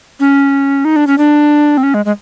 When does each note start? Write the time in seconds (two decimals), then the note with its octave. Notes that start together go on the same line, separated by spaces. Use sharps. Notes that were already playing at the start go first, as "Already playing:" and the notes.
0.20 C#4
0.85 D#4
0.96 D4
1.07 C#4
1.18 D4
1.77 C4
1.83 C#4
1.94 G#3
2.05 G#3